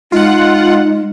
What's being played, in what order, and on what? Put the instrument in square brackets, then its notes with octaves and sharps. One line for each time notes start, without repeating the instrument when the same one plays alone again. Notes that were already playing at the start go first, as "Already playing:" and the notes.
[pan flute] G#3 [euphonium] D#4 [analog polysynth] F4 F#5